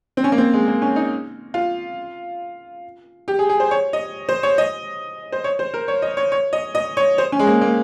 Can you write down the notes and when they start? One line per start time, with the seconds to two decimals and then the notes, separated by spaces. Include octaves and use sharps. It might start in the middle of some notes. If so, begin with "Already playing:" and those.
0.17 C4
0.24 C#4
0.32 A#3
0.38 C4
0.53 G#3
0.68 A#3
0.82 C#4
0.96 D#4
1.54 F4
3.28 G4
3.39 G#4
3.49 G#4
3.60 C5
3.71 C#5
3.93 D#5
4.29 C5
4.43 C#5
4.58 D#5
5.32 C5
5.44 C#5
5.59 C5
5.74 A#4
5.88 C#5
6.02 D#5
6.17 C#5
6.32 C#5
6.53 D#5
6.75 D#5
6.97 C#5
7.18 C5
7.32 C#4
7.39 G#3
7.47 A#3
7.61 A#3